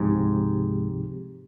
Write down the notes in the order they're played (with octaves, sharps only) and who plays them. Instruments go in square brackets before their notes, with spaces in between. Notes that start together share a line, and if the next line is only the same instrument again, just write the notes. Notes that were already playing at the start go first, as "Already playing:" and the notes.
Already playing: [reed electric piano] C#2 C3 F3 C4 G4 [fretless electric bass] G#2